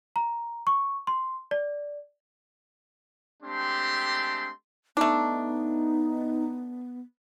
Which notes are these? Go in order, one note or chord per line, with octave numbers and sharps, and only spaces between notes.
A#5
C#6
C6
D5
G#3 A3 C4 D4 G4 C6
A3 B3 D4 D#4